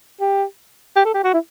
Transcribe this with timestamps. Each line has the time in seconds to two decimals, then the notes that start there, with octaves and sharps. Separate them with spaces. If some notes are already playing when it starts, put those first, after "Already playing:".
0.20 G4
0.96 G4
1.05 A4
1.14 G4
1.24 F#4
1.34 E4